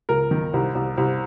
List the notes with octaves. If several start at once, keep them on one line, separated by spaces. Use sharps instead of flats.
C#2 A#4
D#3
C2
C2
C2